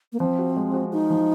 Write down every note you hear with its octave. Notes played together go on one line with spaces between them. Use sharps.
A#3
F3 C4
F#4
G#3
F#4
D#4 F#4
F3